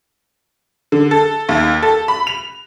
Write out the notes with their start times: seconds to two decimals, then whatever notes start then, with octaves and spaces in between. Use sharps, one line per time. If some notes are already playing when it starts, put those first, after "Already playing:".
0.92 D3
1.11 A4
1.49 D#2
1.82 A4
2.08 B5
2.27 F7